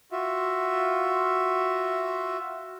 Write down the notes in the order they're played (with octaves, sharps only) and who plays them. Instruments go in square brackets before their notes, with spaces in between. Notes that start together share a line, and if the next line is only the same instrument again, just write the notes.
[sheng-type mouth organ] F4 F#4 E5